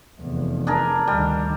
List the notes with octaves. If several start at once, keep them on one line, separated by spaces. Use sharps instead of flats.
F1 E2
D4 G#4 A#4
D2 D#3 G3